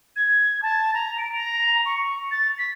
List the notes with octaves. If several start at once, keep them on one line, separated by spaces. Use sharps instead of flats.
G#6
A5
A#5
D7
A#5
C#6
A6
B6